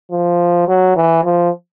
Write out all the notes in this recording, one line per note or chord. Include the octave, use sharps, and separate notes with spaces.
F3
F#3
E3
F3